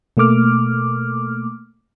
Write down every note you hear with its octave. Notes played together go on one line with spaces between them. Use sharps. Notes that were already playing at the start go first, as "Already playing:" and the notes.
B2 A3 A#3 D6 F6